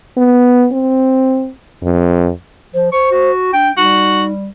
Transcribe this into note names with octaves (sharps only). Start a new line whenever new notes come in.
B3
C4
F2
F3 C5
C5 C#6
F#4
D4 G5
G3 D#4 F#4